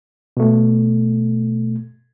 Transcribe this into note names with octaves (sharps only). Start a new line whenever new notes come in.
B2 A3